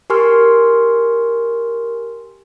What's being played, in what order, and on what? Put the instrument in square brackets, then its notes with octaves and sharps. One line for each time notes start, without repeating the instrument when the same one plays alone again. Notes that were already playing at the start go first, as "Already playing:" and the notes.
[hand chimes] G4 A#4 G#5 C6 C#6 F6